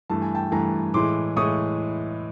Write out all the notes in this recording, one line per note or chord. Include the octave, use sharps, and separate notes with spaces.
G2 E3 A3 A5
G#5
G5 A5
G2 E3 A3 G#5 A#5
A2 E3 G#3 C6 D6
A2 E3 G#3 C#6 D#6